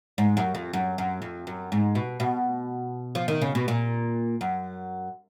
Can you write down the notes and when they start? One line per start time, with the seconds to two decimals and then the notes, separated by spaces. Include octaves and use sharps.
0.18 G#2
0.37 F#2
0.55 F2
0.73 F#2
0.98 F#2
1.22 F2
1.47 F#2
1.72 G#2
1.95 B2
2.20 B2
3.15 F3
3.28 D#3
3.42 C#3
3.55 B2
3.68 A#2
4.41 F#2